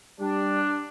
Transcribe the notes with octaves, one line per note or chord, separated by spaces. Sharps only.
G3 D4